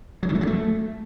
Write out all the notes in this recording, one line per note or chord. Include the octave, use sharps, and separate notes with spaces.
F#3
D#3
A3
F#3
A3